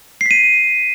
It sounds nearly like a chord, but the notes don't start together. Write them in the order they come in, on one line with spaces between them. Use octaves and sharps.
C7 B6 D#7